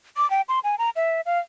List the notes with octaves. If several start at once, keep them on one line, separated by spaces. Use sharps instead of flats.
D6
G5
C6
G#5
A#5
E5
F5